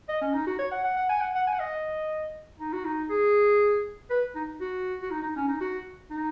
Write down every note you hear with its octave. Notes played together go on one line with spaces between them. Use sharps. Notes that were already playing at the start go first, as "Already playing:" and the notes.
D#5
C#4
D#4
F#4
C#5
F#5
F#5
F#5
G#5
F#5
F#5
G#5
F#5
D#5
D#4
F#4
D#4
G#4
B4
D#4
F#4
F#4
D#4
D#4
C#4
D#4
F#4
D#4